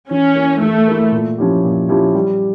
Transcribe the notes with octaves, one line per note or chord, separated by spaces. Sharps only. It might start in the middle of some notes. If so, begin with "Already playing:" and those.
E3 C#4
A#3 E4
E3 A3
A#3 E4
A#2
F3 C#4 E4 G4
A#2
F3 C#4 E4 G4
G3